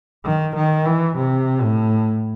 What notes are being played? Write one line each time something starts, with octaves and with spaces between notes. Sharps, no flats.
D#3
D#3
E3
C3
A2